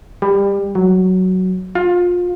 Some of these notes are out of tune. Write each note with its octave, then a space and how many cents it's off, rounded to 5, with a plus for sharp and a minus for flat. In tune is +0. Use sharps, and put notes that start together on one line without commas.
G3 +25
F#3 +5
F4 +25